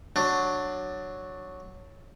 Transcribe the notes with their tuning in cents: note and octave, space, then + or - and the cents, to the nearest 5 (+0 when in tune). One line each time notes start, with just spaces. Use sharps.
F#3 +0 D4 +15